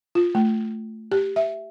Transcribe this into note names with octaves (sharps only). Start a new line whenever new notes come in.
F4
A3
G4
E5